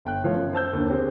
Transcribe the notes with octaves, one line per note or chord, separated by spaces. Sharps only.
G1 G5 F#6
E3 F3 A3 F4 C#5
F#2
C5 A5 E6 G6
D#2 D3
C4 G4 G#4 C5